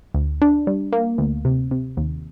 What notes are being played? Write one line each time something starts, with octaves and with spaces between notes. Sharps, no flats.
D2
D4
G3
A#3
D2
C3
C3
D#2